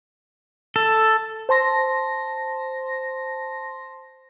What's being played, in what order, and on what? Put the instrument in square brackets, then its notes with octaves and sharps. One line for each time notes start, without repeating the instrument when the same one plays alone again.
[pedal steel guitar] A4
[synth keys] C5 A5 C6 A#6